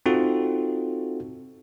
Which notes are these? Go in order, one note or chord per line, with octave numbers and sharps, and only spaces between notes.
C4 D#4 F4 F#4 A4